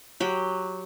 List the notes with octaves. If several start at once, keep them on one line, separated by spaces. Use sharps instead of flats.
F#3 G4